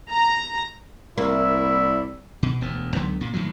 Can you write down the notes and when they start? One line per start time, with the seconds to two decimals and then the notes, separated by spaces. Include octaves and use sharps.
0.11 A#5
1.18 C2 A#3 E4 D5 E5
2.43 B2
2.61 E1 D2 B3
2.95 C#2 D3 F#3 B3
3.20 G2 A#2
3.33 A2 D#3 F3 F#3